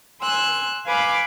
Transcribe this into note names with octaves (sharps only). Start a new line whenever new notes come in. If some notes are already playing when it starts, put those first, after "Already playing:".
G#5 C6 E6 F#6
B4 F5 G#5 B5 D6